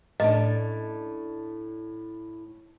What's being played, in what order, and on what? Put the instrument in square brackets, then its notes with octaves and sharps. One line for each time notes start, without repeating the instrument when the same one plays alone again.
[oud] A2 C#4 D4 [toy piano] D#5